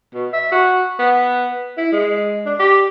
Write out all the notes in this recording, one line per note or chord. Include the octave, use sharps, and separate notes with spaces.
B2
E5
F#4
B3
E4
G#3
D4
G4